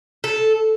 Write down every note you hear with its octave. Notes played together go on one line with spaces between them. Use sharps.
A4